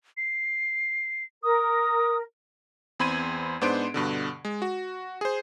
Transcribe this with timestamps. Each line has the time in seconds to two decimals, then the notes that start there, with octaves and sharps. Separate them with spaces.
0.17 C7
1.43 A#4 D#6
3.00 E2 C4 B5 C6 G#6 D#7
3.61 G#2 B3 D4 C5 C6 D7
3.94 G2 B2 D3
4.45 G#3
4.62 F#4
5.21 G#4 C5